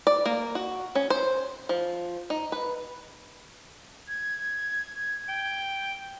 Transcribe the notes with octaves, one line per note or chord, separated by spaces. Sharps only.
D5
A#3
F#4
C#4
C5
F3
D#4
B4
G#6
G5